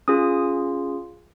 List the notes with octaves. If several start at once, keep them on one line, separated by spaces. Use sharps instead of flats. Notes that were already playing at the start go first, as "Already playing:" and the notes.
C#4 F4 G#4 D#6